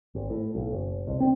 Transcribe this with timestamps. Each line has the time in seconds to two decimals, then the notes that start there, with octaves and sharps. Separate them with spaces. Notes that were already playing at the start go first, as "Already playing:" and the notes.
0.15 G#1
0.30 A2
0.55 B1
0.73 F#1
1.07 C2
1.20 C4